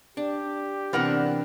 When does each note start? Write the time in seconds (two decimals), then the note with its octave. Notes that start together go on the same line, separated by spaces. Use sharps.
0.17 D4 G4
0.93 C3 E3 B3 D4 A#4 F#5